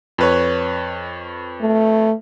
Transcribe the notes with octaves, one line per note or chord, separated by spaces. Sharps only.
F2 B4 C#5
A3